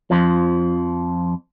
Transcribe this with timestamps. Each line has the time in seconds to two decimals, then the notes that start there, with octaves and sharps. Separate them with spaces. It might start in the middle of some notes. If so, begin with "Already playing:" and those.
0.11 F2 F3